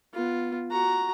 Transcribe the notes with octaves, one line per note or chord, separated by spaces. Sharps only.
B3 F4
F#4 A#5